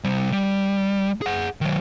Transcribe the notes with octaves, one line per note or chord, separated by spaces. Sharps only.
C3 G3
G3
G#4 F#5
D#3 F#3